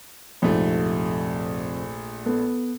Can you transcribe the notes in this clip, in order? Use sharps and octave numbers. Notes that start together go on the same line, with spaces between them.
A#1 F2 G#2 C3 A3
B3 A4